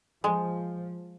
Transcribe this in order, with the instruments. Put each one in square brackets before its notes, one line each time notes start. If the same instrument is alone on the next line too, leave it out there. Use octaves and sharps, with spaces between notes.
[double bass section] F3 [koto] G#3